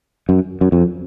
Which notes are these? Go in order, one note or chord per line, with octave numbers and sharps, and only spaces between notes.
F#2
F#2
F2